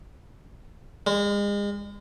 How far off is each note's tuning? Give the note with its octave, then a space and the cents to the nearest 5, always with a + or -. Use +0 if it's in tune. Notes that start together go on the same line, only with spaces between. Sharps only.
G#3 -35